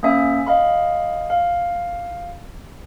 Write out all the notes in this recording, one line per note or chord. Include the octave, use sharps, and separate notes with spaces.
A#3 C#4 E5 G#5
D#5 F5 B5
F5